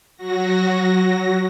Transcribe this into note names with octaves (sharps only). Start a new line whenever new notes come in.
F#3 F#4 A#6